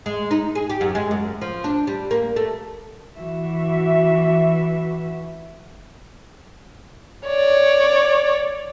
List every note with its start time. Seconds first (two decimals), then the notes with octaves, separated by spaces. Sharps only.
0.06 G#3
0.31 D#4
0.55 G#4
0.69 G4
0.81 F#2
0.95 G#3
1.11 F#2
1.42 F3
1.64 D4
1.87 G3
2.11 A#3
2.36 A3
3.16 E3 F#4 E5
7.27 C#5 D5